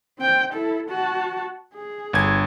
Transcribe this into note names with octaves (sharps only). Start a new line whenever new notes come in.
C4 G5
E4 A4
F#4 A5
G#4
G1 G#6